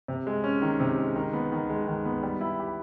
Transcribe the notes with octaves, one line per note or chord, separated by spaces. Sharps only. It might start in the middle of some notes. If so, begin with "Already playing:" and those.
C3
G#3
C#4
D#3
C3
G#3
D#3
B3
D#3
G#3
D#3
B3
G3
E4
G4